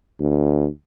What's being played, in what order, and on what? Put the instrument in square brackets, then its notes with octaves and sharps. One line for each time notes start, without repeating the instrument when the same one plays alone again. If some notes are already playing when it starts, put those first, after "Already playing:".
[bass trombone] D2